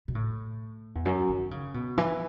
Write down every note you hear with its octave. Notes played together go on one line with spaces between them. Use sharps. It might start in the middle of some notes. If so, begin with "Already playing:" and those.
B2
A2
E2
F#2
D#3
C#3
B2
E3